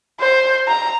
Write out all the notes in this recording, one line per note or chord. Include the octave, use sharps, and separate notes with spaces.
C5
A#5